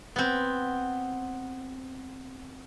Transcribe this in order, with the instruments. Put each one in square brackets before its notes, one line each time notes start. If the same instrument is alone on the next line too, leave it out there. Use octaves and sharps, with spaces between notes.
[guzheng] B3 C4